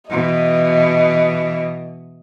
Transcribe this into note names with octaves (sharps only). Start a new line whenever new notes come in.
B2 E3 D#5